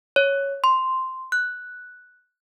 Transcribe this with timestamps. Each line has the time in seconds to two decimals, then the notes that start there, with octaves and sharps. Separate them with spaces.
0.16 C#5
0.64 C6
1.32 F#6